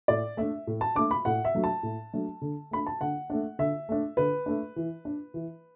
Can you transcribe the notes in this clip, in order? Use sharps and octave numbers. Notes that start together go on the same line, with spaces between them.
A2 D5
A3 D4 E5
A2
A5
A3 D4 D6
B5
A2 F#5
E5
F#3 A3 D4
A5
A2
F#3 A3 D4
D3
A3 D4 B5
A5
D3 F#5
A3 D4
D3 E5
A3 D4
D3 B4
A3 D4
E3
D4
E3